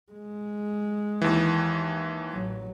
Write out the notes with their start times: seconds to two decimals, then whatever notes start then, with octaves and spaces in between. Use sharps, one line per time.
0.12 G#3
1.22 D#2 E3
2.31 A1 F#3